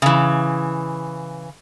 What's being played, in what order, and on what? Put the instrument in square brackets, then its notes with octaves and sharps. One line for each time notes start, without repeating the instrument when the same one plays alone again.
[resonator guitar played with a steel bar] C#3 E3